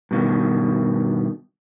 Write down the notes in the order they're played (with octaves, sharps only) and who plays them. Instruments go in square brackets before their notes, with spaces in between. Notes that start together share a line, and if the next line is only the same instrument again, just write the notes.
[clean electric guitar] G2 B2 D#3